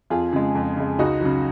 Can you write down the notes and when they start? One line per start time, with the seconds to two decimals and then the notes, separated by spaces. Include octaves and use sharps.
0.10 F2 F4 G#4
0.33 C#3 G#3
0.55 F2
0.77 C#3 G#3
0.99 C#2 D#4 F#4
1.21 C#3 F#3